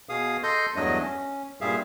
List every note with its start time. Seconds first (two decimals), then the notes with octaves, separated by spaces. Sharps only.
0.09 B2 G#4 F5 D#6
0.43 A4 D#5 C6 G6
0.76 E2 G2 F#3 A3 D4 D#5
1.02 C#4
1.61 G2 A#2 G3 G#4 E5 F5